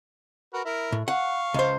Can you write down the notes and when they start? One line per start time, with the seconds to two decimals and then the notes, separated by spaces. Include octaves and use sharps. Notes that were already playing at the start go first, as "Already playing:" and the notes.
0.54 F#4 A#4 B4
0.65 E4 A#4
0.92 A2
1.08 F5 F#5 C#6
1.54 C#2 C5